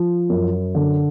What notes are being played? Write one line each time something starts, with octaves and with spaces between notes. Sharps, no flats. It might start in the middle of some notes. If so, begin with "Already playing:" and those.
Already playing: F3
F#2
D3